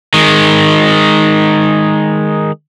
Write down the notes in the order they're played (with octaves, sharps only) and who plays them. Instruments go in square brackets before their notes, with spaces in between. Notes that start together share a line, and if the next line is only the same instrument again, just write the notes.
[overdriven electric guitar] D#3 G#3